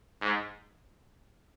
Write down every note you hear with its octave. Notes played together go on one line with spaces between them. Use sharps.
G#2